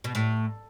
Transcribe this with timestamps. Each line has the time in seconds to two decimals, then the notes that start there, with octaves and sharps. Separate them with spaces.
0.04 B2
0.15 A2